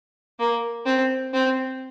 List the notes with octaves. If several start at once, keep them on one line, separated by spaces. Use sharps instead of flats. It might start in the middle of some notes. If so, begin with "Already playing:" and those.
A#3
C4
C4